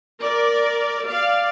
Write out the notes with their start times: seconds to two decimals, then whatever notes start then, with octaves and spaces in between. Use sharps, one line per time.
0.21 A#4 D5
1.07 D5 F5